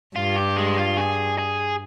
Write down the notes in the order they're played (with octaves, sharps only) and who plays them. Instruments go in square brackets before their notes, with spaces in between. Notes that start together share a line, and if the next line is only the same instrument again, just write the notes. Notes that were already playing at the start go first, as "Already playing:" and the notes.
[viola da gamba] G2 [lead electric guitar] F4
[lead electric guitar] G4
G#3
F4
G#4
G#4